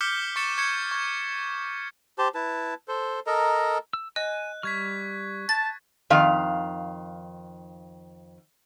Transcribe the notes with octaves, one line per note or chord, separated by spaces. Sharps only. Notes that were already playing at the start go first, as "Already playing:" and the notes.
D6 F6 G6 B6 C#7 G7
C#6 A6 C#7 E7
C#6 G#6 C#7
C#6 G#6
G4 C5 A5
E4 B4 A5
A4 C5
A4 A#4 D#5 A#5
E6
D#5 G#5 F#6
G3 C#6 F6 G#6 B6
A5 A6
F2 D#3 F5